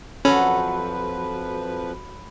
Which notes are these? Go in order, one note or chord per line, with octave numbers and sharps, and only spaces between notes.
F2 F3 F#3 C#4 A4 B4 B5